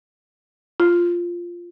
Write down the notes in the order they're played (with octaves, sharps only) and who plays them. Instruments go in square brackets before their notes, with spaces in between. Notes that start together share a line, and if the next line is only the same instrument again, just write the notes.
[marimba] F4